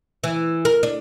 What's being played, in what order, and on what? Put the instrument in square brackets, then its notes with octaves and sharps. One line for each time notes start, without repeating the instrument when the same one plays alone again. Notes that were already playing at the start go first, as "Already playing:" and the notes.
[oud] E3
A#4
D4